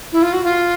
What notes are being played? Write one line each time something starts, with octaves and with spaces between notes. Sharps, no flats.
E4
F4
F#4
F4